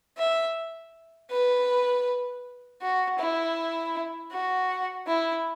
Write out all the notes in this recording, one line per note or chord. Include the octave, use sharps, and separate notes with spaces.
E5
B4
F#4
E4
F#4
E4